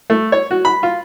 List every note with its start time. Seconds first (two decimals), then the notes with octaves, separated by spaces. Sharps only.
0.10 A3
0.32 C#5
0.51 F#4
0.65 B5
0.83 F4